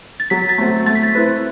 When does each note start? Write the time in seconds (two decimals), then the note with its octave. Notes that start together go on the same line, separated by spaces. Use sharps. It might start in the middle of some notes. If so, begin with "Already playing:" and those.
0.20 A6
0.30 F#3 B6
0.49 A6
0.58 A3 C4 F#4
0.86 A3 A6
0.95 B6
1.03 A6
1.15 C4 E4 B4